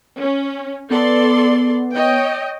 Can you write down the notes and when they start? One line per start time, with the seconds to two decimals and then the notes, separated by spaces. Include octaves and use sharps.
0.19 C#4
0.90 B3 A4 D5 C6
1.94 C#5 D#5 G5